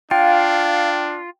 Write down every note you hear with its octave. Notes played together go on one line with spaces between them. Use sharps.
D4 F4 F5 G5